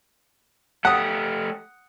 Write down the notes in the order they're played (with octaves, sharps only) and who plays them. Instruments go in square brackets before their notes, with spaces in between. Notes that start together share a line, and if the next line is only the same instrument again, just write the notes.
[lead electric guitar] A3 G4 [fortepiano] F#5 D#6